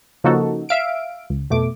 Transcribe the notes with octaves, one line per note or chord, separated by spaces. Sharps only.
C#3 F3 A#3 D#4 F#4 A4
E5 F5 D7
C#2
F2 B2 A3 D6